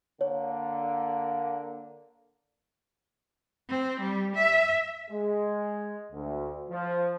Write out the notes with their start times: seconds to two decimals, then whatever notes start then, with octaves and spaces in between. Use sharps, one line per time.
0.21 D3 A#3 C#5
3.69 C4
4.00 G3
4.35 E5
5.11 G#3
6.12 D2
6.70 F3